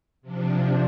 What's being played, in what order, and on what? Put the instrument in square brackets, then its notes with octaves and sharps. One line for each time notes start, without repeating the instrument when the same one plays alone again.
[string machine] C3 F3 D4